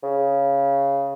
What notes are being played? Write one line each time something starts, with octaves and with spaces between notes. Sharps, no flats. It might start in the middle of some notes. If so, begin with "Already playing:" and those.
C#3